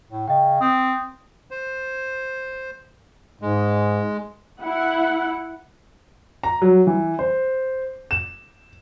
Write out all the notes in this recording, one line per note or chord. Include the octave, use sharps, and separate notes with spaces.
A2
C#3 D#5 G5
C4 D#6
C5
G#2 G#3
E4 F#5
A#5
F#3
E3
C5
E7